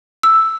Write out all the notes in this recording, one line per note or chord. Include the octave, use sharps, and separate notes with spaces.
E6